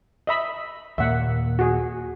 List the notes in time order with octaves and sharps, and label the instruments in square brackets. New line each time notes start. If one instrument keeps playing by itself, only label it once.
[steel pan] D#5 E5 B5
[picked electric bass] D#2 A#2 A#3 [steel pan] E5 F#5
[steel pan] F#4 G#4